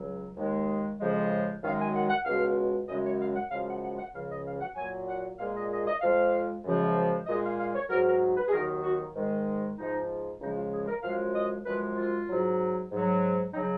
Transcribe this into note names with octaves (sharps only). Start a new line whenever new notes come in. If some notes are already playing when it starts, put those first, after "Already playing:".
Already playing: C#2 F#3
D#2 D#3 G#3
F2 C#3 F3 G#3
F#2 D#3 G#3 F5
G#5
F#5
F#5
C#2 B2 G#3 F5
F#2 C#3 G#3 D#5
C#5
F5
F#5
F#2 C#3 F3 G#3 F5
F#5
F#5
F#5
C#2 C#3 F3 F5
D#5
F5
F#5
A#2 F#3 G#5
F#5
A#2 G#3 F5
D#5
D#5
D#5
F2 F3 G#3 F5
F#2 C#3 F3 G#3
A#2 G#3 D#5
F5
F5
C#5
G#2 F#3 A#4
A#4
B4
G#4
D#2 D#3 F#3 A#4
F#4
G#2 D#3 G#3
G#2 F3 G#3 D#4
C#2 C#3 F3 G#3 D#4
F4
G#4
A#4
F#2 F3 G#3 F5
D#5
F#2 F3 G#3 B4
F4
G#2 F#3
G#2 F#3
C#3 F#3 D#4